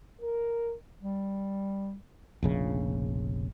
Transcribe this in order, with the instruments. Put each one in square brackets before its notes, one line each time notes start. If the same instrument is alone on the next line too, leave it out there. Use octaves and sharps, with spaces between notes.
[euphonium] A#4
[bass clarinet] G3
[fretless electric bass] F1 A#1 C#3